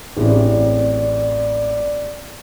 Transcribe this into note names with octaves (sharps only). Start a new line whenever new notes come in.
A1 C4 E4 G#4 D5